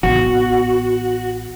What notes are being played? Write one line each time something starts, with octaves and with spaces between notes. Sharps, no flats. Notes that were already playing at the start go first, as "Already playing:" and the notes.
A1 B3 F#4